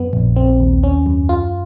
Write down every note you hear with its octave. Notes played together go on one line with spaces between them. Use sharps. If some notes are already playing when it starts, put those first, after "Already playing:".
Already playing: F#2 B3
A#1
C4
D#2
C#4
F#2
F4